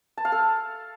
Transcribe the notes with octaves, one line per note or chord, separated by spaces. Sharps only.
A5
F5
A4